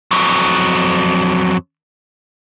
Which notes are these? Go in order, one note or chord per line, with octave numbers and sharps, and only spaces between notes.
F2 F#3